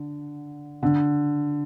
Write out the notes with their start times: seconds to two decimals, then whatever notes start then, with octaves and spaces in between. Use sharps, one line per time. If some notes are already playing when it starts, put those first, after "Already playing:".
Already playing: D3
0.83 D3